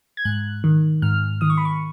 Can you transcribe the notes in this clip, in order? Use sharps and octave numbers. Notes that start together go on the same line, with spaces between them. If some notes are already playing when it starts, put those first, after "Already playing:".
G#6
G#2 F#6
D#3
G#2 F6
D#3 D#6
C#6
B5
C#6